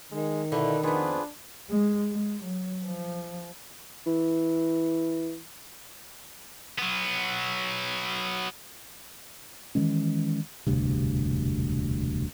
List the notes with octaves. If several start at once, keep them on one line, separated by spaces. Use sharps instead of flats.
D#3 G#3
B2 D3 E4 A4 B4
F2 B3 D4 F4 G#4 B4
G#3
G#3
F#3
F3
E3
F#3 B3
D#3 E3 G#3 C#4
E1 D2 G2 C3